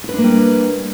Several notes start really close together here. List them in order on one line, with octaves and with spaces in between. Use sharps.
E4 B4 D4 A#3 G3